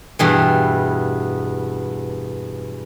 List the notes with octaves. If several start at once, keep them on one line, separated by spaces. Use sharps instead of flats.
E2 G2 B2 E3